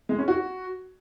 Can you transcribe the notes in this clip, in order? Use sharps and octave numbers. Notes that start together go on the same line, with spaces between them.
G#3
C#4
F#4